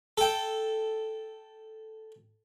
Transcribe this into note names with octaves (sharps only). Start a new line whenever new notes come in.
A4 G5